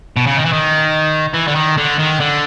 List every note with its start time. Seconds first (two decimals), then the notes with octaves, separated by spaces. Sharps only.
0.17 B2
0.27 C#3
0.37 D#3
0.45 E3
0.53 D#3
1.34 E3
1.48 D3
1.55 D#3
1.77 D3
1.98 D#3
2.20 D3